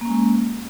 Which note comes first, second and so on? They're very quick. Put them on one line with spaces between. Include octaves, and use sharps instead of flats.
A#3 C#4 G#3